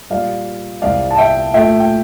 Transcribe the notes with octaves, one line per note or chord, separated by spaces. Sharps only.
A#2 G3 A#3 D5 F5
C2 C3 G3 D5 F5
A5
E5 G5
A#2 A3 E5 G5
G5